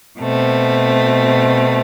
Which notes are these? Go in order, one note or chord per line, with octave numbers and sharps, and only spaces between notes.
B2 A3 C4